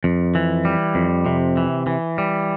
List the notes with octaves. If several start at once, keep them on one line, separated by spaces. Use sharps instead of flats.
F2
E3
G3
F2
C3
E3
E3
G3